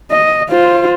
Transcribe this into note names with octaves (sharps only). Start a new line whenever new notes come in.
D#5
F4 C5